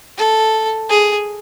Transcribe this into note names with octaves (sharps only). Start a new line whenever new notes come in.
A4
G#4